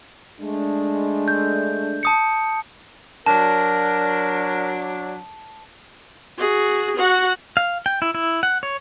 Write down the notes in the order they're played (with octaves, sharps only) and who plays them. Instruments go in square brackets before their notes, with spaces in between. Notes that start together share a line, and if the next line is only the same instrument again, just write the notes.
[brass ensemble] G#3 A3 D4
[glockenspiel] G6
A5 D#6 C#7
[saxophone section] F#3 D4 [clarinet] A#4 [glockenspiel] A5
[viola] F#4 G#4
F#4 F#5
[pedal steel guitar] F5
G5
E4
E4
F#5
C#5